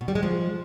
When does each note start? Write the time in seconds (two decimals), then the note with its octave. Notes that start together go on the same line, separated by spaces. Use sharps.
0.01 B2
0.08 G3
0.15 G#3
0.23 F3